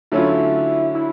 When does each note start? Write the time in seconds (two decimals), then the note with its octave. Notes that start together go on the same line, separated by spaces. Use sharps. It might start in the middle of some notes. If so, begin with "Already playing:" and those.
0.12 D3 F#3 A3 C#4 E4 F4
0.95 E4